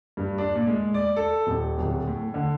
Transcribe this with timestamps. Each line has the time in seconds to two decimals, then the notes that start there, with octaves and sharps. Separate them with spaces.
0.17 G2
0.38 D4
0.55 A#2
0.67 G#3
0.94 D5
1.16 A4
1.47 D#1
1.78 D1
2.07 A2
2.34 D3